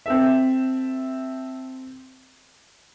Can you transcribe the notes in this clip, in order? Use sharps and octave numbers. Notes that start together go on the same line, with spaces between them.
C4 A4 E5